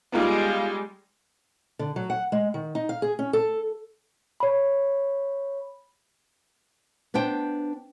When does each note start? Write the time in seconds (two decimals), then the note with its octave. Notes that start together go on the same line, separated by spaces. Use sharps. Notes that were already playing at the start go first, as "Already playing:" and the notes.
0.12 G3 G#3 B3 D#4 F4
1.79 D3
1.96 F#3
2.10 F#5
2.32 G#3
2.54 D#3
2.75 D#4
2.89 F5
3.02 G#4
3.19 C#4
3.33 A4
4.40 C#5 B5
7.14 B3 D4 C5 G5